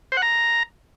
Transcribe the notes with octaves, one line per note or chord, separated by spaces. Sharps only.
C5
F#5
A#5